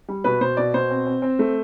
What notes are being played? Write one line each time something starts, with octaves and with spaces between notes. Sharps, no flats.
G3
B2 B4
B2 C5
B2 D5
B2 C5
C4
C4
C4
A3